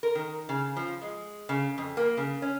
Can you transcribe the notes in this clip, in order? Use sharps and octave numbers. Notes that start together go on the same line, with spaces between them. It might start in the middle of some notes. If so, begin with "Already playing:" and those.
A#4
D#3
C#3
F3
G#3
C#3
F2
A#3
C#3
C#4